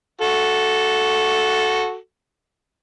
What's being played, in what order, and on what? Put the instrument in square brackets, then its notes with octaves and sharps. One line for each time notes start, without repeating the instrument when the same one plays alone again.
[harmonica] F#4 A4